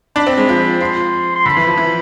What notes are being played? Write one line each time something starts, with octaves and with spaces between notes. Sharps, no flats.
D4 B5
C4
G#3
F3
F3 C6
C6
D3 B5
E3
F3
E3